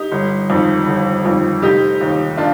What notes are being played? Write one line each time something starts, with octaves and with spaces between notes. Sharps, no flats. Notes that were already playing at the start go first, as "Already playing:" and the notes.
Already playing: D#4 G4
G1
F2 D#3
G1
F2 D#3
F1 D#4 G4
D#2 D#3
D4 F4